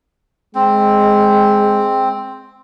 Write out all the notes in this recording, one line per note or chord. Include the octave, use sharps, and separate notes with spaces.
G#3 C4